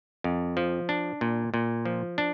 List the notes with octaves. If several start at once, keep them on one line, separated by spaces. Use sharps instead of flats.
F2
F3
D4
A#2
A#2
F3
D4